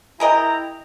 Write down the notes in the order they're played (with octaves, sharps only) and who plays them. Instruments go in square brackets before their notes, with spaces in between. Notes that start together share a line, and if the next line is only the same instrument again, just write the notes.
[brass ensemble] E4 G5 A#5 [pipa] G#4 A#4 D#5